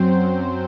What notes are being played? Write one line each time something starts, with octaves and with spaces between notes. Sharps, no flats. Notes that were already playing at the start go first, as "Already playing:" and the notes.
Already playing: F#2 F#3 C4 C5